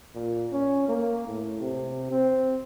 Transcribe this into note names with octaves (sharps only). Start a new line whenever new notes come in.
A#2
C#4
A#3
A2
C3
C4